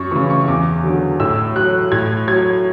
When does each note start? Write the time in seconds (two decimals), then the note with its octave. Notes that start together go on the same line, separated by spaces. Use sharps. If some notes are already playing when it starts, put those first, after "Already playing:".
Already playing: F#2 C#6
0.11 C#3 E3 C#6
0.30 C#6
0.48 E2 D6
0.83 D3 F#3
1.20 A2 E6
1.56 F#3 F#6
1.92 A2 G#6
2.27 F#3 G#6